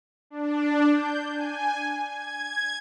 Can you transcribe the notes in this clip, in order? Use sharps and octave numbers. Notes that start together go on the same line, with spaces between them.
D4
G6
G#5
G#6